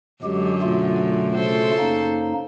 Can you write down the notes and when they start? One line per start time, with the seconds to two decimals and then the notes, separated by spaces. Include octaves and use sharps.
0.23 F#2 D3 G#3 G4
0.62 B2 A3 F4
1.36 C#3 A4 C5
1.79 F#2 A#3 D#4